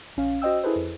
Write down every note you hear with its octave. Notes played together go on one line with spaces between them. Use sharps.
A#1 C#4 F5
F#4 C5 D#5 G5 E6
E4 G#4 A4 B4 C5
F2